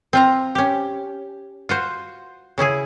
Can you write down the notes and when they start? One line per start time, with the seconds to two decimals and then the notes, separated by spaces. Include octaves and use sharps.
0.13 C4 F4 A#5
0.55 C#4 G4
1.69 F4 F#4 C5
2.58 C#3 C#4 E4 G#4